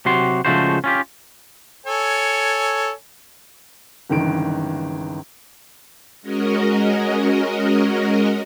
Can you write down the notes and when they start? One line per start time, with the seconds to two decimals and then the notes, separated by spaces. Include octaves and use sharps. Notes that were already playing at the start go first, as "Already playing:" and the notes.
0.06 C3 F#3 F#4 G4 C6
0.45 C#3 F3 G#3 A3 F#4 C5
0.84 C#4 F4 G4
1.86 A4 C#5 G#5
4.09 G1 C#2 D#3 E3 D7
6.22 G#3 C#4 F#4 A#4 D#5